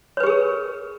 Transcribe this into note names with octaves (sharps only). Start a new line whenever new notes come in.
G4 G#4 A#4 B4 C#5